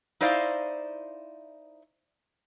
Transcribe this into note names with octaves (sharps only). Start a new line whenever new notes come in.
D#4 E4 C5 D5 F5